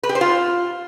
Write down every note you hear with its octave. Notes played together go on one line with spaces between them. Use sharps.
B4
G4
C5
F4